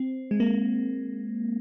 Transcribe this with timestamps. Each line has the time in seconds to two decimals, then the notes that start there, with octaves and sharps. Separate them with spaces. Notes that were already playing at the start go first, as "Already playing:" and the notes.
Already playing: C4
0.31 G#3
0.40 A#3